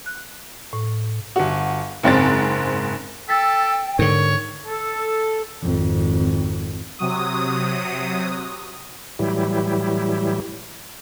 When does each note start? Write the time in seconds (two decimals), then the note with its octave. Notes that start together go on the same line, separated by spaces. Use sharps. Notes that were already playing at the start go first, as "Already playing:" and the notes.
0.06 F#6
0.73 A2
1.36 G1 F#4
2.03 F#1 G#2 C4 A6
3.29 A4 G5 E6 A6 B6
3.99 G#2 D3 A#4 C#5
4.66 A4
5.63 G#1 F2
6.98 C3 F#3 D#6
9.19 A2 E3 F#3 G3 E4 G4